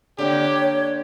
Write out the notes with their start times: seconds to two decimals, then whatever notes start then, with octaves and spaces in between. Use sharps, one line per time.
0.18 D3 A#3 D4 G4 C#5